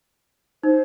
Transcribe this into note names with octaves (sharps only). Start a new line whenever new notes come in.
D#4 C5